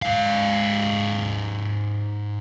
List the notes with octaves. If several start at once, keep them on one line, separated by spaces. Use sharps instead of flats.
G#2 F5